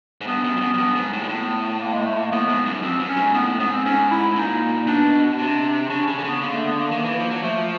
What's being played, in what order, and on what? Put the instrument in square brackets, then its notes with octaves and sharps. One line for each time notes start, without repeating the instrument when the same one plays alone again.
[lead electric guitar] G#2
[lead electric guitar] G2 [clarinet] B3
[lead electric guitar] F#2
F2
F#2
F#2
G2
G#2
A2
A#2
[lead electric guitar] A2 [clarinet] B3
[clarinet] A#3
G#3
A3
A#3
[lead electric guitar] A2 [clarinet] B3
[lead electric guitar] G#2
F#2
[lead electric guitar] F2 [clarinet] C4
[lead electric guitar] F#2
[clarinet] C#4
[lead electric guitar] G#2
[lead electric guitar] A2 [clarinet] B3
[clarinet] B3
[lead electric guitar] G#2 [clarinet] B3
[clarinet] C4
[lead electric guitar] G#2 [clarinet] C#4
[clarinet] E4
[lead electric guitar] A#2 [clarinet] D#4
[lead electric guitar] B2 [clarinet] D4
[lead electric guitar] C3 [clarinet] D4
[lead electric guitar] C#3 [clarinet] D4
[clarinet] C#4
[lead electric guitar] C#3
[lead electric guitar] D3 [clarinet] D4
[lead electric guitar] C#3 [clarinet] B3
[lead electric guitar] D3 [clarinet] A#3
[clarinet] A3
B3
A#3
[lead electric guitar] D#3
E3
F3
F#3
[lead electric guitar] F3 [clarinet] A3